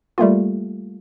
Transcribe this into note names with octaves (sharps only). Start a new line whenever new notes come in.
G3 A3 A#3 F4